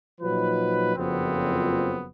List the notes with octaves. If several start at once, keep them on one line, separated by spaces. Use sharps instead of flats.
A#2 F3 F#3 D#4 B4
F#1 F2 F3 F#3 B3 C4